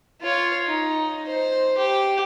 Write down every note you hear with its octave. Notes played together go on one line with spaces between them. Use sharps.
F4 C#5
D#4
C5
G4